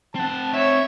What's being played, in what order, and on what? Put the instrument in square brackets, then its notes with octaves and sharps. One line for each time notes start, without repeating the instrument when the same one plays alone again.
[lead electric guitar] C4 F#5 [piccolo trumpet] A5
[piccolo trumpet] C#5 [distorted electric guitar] E5